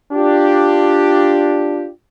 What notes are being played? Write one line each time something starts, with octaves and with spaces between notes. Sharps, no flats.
D4 F4 G4